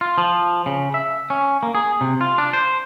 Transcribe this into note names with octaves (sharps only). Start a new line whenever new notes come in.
F4
F3
C#3
E5
C#4
A#3
G#4
C3
F4
D4
C5